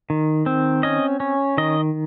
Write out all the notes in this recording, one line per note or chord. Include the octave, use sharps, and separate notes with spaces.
D#3
C4
C#4 D#5
C#4
D#3 D#5